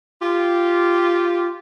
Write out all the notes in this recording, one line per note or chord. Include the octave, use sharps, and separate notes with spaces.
F4 G4